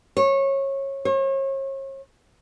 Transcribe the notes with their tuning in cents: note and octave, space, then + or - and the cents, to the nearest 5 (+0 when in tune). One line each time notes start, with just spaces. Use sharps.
C#5 -20
C#5 -40